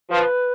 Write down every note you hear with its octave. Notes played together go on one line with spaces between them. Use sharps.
F3 B4